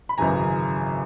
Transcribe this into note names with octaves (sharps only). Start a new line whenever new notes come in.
B5
G#1 F#2 C#3 E3 G#5 A#5